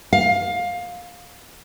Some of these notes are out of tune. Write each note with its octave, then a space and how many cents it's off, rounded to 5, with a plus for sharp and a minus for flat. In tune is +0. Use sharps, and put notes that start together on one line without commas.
F5 +20